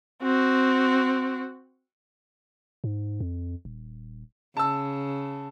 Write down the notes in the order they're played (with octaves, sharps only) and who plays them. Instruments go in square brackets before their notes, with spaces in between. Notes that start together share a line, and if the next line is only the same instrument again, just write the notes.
[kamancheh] C4 F#4
[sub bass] G#2
F2
D#1
[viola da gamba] C#3 [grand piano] A5 E6